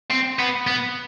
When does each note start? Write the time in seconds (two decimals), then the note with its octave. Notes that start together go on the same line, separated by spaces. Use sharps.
0.11 C4
0.39 B3
0.67 B3